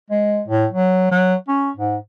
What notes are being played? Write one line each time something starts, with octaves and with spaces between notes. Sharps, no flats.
G#3
A2
F#3
F#3
C#4
G#2